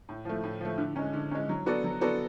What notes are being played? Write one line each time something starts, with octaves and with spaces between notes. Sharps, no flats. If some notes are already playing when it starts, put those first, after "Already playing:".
A2
F3 A3
A2
F3 A3
D3
G#3 C#4
D3
G#3 C#4
F#3
B3 F#4 A4 D5
F#3
B3 F#4 A4 D5